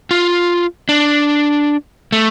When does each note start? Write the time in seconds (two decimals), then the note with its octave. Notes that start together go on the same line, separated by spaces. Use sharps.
0.11 F4
0.89 D4
2.12 A3